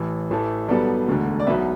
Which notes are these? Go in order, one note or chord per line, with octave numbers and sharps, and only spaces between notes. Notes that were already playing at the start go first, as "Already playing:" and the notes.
Already playing: A1 A2 E3
A1 A2 E3 A3
B1 B2 G3 B3 A4 D5
E1 D2 D3
D5
B1 B2 B3 B4 E5